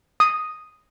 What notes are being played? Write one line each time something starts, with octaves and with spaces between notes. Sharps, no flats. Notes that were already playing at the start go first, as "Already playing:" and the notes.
D#6